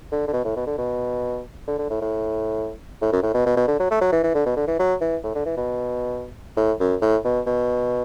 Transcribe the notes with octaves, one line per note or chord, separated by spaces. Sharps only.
D3
D3
B2
A2
B2
D3
B2
D3
D3
A2
A2
A2
F#2
A2
B2
B2
B2
D3
F#3
A3
F#3
E3
E3
D3
B2
D3
E3
F#3
E3
A2
D3
E3
B2
A2
F#2
A2
B2
B2